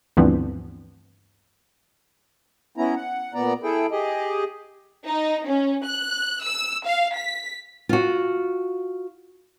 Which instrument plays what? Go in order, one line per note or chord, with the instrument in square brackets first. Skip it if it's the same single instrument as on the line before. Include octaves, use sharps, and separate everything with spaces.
[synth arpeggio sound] D2 G2 E3 F3 B3 C4
[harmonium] B3 C#4 E4 A#5
F#5
A#2 B3 D5 A#5
E4 G#4 A4 G5
G4 G#4 D#5
[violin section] D#4
C#4
F#6
E6
F5
B6
[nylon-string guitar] F4 F#4